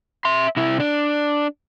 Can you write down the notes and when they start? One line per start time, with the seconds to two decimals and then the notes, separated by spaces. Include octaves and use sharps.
0.25 E5 C6
0.57 C3 E4
0.80 D4